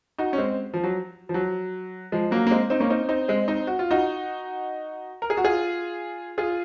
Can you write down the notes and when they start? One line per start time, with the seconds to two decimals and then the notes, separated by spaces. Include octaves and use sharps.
0.18 D#4 F#4
0.33 C#4
0.38 G#3 C4
0.74 F3
0.84 F#3
1.29 F3
1.34 F#3
2.12 F3 G#3
2.31 F#3 A#3
2.47 A#3
2.51 G#3 C4
2.70 C4 D#4
2.80 A#3 C#4
2.90 C4 D#4
3.09 C4 D#4
3.28 G#3 C4
3.48 C4 D#4
3.67 F#4
3.79 F4
3.91 D#4 F#4
5.22 A#4
5.30 G#4
5.37 F#4
5.44 F4 G#4
6.38 F4 G#4